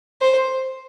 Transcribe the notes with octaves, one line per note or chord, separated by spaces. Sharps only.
C5